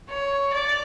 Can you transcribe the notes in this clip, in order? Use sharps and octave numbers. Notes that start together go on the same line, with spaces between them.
C#5
D5